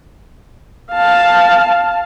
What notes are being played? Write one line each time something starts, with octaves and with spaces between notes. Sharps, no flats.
F5 A5